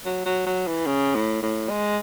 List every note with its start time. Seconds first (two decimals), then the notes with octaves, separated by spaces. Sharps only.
0.05 F#3
0.26 F#3
0.46 F#3
0.67 E3
0.86 C#3
1.15 A2
1.42 A2
1.69 G#3